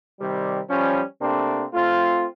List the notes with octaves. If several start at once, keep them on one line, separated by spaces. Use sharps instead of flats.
C3 D#3 G3
F3 G3 C#4
C3 A3 A#3 C4 D4
A3 C4 F4